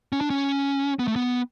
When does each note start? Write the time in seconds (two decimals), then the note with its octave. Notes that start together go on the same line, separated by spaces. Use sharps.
0.12 C#4
0.21 D4
0.30 C#4
0.99 B3
1.08 A3
1.16 B3